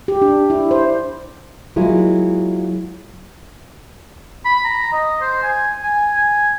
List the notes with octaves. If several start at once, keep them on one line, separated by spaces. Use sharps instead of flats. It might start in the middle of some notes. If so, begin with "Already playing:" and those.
G4
D4
E4
C5
F#3 G#3 A#3 E4 F4
B5
A#5
D#5
C5
G#5
G#5
G#5